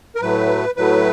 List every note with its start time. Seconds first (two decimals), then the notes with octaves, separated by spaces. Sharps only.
0.15 A#4
0.22 A2 F#3 A3 B4
0.76 A2 F#3 A3 B4